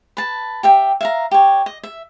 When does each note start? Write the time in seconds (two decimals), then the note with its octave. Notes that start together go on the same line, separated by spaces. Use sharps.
0.17 B4 A5
0.63 G4 E5 G5
1.01 E5 F5 A#5
1.31 G4 C#5
1.66 D#5
1.83 E5